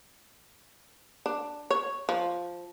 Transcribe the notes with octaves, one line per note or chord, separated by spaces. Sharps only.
D4
C#5
F3